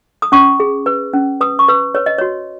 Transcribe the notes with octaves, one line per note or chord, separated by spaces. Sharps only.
D#6
C#4 C#6
G#4
B4
C#4
B4 D#6
C#6
B4
B4 C#5
D#5
F#4 C#5